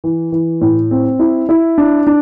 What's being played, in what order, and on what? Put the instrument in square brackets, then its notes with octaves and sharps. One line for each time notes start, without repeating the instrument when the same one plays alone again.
[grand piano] E3
E3
A2
C4
E4
E4
D4
D4